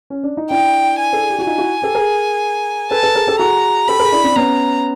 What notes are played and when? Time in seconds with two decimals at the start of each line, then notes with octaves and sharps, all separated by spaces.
0.10 C#4
0.23 D4
0.37 D#4
0.50 D4 E4 G5
0.98 G#5
1.13 A4
1.20 G#4
1.30 G4
1.39 F#4
1.47 D#4 F4 G#5
1.58 E4 F#4
1.82 G4 A4
1.95 G#4 A#4
2.91 A4 B4 A5
3.03 A4 B4
3.15 G#4 A#4
3.27 G4 A4
3.39 F#4 G#4 A#5
3.88 G4 A4 B5
3.99 G#4 A#4
4.12 D4 E4
4.24 C4 D4
4.36 B3 C#4 A#5